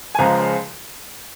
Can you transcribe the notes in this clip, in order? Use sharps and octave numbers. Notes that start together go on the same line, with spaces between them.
G#5
C#2 C#3 F3 G#3 F5 A#5